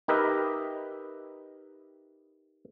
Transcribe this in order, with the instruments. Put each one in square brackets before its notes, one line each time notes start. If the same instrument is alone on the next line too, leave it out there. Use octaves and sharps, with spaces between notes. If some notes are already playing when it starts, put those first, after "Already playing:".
[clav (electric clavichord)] D#4 G4 A#4 B4 D#5 E5